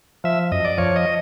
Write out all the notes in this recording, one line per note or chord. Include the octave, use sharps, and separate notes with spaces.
F3 E5
F#2 D#5
D5
F3 C#5
D#5